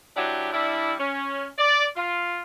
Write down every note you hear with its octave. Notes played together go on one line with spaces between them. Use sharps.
F#3 D4 E4 G4
G3 D4 E4
C#4
D5
F4